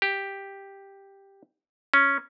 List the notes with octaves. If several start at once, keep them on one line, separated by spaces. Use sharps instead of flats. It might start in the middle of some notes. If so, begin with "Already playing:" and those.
G4
C#4